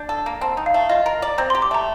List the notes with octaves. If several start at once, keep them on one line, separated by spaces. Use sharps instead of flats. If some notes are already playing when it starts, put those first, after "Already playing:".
Already playing: D4 G6
A4
A#3
C4 A5
D#4
F5
A3
F4 D#5
A#4
D5
C4 A#5
G4 C6
D6
A3 A#5